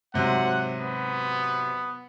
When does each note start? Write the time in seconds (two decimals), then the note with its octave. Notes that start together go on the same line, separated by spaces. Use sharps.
0.14 G#2 C3 F#3 F#5
0.80 B3